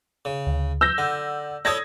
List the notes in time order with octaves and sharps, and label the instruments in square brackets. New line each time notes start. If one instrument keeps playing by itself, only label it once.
[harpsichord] C#3
[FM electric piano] D2
[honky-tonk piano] E6 G6 A#6
[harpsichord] D3 [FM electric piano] F#5
[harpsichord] E4 A4 C#5 [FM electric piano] D5 [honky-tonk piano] D#6 G#6 A#6